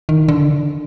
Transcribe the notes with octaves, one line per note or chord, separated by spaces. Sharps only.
D#3
D3